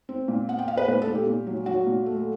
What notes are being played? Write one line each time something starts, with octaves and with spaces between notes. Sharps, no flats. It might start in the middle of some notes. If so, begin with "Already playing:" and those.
C4
A#2
B3 F#5
G5
B3 F5
B4
A#2 B4
A4
A#2
G4
A#2
F#3
F#3 F#4
A#2
A3